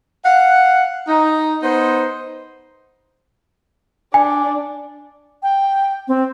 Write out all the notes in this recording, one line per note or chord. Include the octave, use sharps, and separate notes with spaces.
F5 F#5
D#4
B3 D#4 C5
D4 G#5
G5
C4